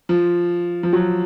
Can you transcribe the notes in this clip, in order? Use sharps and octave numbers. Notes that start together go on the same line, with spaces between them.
F3
F3
F#3